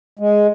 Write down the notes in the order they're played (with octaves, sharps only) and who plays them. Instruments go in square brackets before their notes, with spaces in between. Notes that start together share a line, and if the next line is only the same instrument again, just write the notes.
[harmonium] G#3